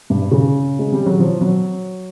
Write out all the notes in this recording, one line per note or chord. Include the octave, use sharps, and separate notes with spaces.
G2
C#3
G#3
G3
F#3
F3
F#3